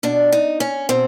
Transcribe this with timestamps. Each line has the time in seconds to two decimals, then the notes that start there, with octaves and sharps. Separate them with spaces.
0.03 B2 D4
0.32 D#4
0.60 C#4
0.89 B2 C4